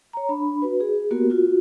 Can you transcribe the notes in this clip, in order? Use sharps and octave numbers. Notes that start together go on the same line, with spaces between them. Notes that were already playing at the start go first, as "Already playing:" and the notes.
C#5 A#5
D4 B5
F#4 B4
G#4
A#3 B3 F#4 G4 A#4
F4 F#4